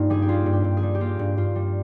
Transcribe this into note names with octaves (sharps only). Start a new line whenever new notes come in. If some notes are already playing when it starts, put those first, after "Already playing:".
Already playing: G2 A#3 D#4 F4
G3 G#4
G4
A#3 F4
G2
G4
G2
G#4
G3
G4
A#3 F4
G2
G2 F4
G3